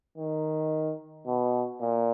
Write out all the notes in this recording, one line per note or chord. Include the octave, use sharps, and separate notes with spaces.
D#3
B2
A#2